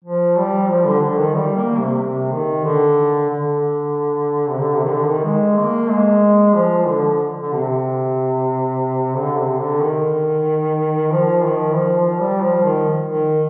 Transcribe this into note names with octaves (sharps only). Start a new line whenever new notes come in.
F3
G3
F3
D3
D3
D#3
G3
A#3
C3
C3
D#3
D3
D3
C3
D3
C3
D#3
D3
D#3
G#3
A#3
G#3
F3
D3
D3
C3
D3
C3
D3
D#3
F3
D#3
F3
F3
G3
F3
D#3
D#3